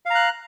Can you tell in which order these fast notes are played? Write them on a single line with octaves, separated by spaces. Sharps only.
F5 A#5 F#6